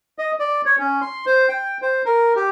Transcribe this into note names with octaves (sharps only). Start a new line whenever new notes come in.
D#5
D5
C#5
C#4
C6
C5
G5
C5
A#4
G4